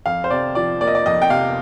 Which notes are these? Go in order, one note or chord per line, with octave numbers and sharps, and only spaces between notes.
F2 F5
C5
C3 D5
F3 D5
A#3 D5
D#5
D5
F2 D#5
G5
C3 F5